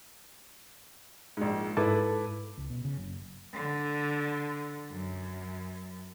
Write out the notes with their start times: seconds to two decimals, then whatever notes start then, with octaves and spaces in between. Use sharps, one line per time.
1.37 A#1 G#2
1.77 G#2 E4 A4 B4 A5 D6
2.57 C#2
2.70 B2
2.85 C#3
2.97 F#1
3.54 D3
4.91 F#2